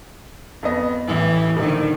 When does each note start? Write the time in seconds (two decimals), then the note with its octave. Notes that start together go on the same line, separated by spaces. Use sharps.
0.63 F2 B3 D#5
1.08 A1 A2 E3
1.57 D#1 D3 D#3